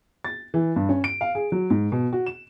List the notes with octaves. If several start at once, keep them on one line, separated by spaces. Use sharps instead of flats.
A6
E3
G2
C#4
D7
F5
G#4
F#3
G#2
B2
F#4
E7